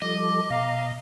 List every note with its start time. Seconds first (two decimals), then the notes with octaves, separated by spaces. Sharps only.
0.02 F3 G3 A4 D#5 D6
0.50 B2 F5 A#5